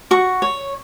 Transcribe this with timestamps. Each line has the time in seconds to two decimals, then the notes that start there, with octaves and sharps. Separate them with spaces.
0.11 F#4 C#6
0.42 C#5